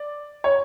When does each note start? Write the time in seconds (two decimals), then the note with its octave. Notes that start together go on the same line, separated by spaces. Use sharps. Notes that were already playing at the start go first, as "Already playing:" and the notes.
Already playing: D5
0.44 C#5